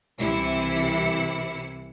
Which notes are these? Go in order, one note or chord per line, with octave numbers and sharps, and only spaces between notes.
C2 C3 E3 E4 C#7